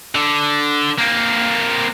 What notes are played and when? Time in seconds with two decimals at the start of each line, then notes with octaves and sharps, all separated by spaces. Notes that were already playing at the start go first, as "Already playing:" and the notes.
0.15 D3
0.98 A#3 C4